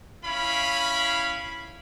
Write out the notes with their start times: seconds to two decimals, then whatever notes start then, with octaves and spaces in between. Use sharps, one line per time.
0.24 C#4 E4 F5 B5